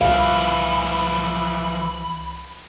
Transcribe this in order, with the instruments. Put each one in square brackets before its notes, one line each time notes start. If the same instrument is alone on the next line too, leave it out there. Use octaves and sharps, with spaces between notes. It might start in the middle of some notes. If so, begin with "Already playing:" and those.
[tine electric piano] C2 [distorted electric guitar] E3 F3 [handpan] F5 [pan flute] B5